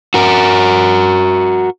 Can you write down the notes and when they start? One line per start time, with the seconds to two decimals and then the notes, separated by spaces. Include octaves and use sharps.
0.14 F#4 A#4